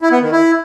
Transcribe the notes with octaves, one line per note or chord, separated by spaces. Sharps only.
E4
B3
D#3
E4